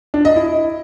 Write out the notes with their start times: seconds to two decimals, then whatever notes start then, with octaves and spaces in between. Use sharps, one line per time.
0.14 D4
0.25 D#5
0.36 E4